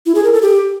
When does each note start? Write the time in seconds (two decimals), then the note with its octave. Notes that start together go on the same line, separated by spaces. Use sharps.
0.06 E4
0.15 G#4
0.24 A#4
0.33 A4
0.42 G4